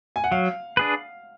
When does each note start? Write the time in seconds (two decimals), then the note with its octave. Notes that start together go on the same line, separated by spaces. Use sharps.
0.16 G#5
0.24 F#5
0.32 F#3 F5
0.77 D4 G#4 B4